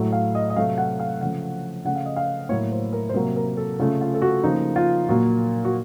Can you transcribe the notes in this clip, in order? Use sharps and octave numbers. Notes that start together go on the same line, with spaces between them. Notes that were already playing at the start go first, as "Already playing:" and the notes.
Already playing: A2 F#3 A3
F5
D#5
D#5
C3 F#3 A3 F5
F#5
F5
C#3 F3 A3 F#5
C#3 A3 F#5
F5
D#5
F5
A2 F#3 A#3 C#5
C5
A#4
C5
C3 F#3 A#3 A#4
A#4
A4
C#3 A3 F4
F4
A4
F#4
C#3 F3 A#3 D#4
F4
A#2 F#3 A#3 F#4
F#4